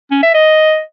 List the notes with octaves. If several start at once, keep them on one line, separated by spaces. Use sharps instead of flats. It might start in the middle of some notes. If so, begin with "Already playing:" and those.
C#4
E5
D#5